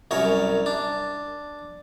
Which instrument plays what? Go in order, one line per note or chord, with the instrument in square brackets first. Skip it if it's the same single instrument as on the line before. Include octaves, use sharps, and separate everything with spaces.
[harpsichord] C2 F#2 A#4 C#5
D4